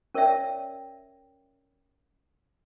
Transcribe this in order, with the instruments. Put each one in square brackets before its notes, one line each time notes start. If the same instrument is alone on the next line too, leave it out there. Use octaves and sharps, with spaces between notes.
[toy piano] C#4 A#4 C#5 D5 E5 G5